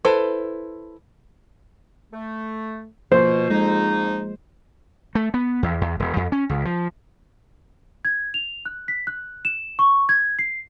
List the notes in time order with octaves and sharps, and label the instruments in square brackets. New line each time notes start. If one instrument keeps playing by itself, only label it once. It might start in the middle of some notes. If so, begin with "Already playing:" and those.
[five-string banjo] E4 A4 B4 C5
[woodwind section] A3
[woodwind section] B2 [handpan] F3 A#3 [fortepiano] C5
[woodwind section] F2 D#4 [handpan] G#3
[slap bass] A3
B3
E2
E2
E1
F2
C#4
C#2
F3
[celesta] G#6
F7
F#6
B6
F#6
E7
C#6
G#6
C7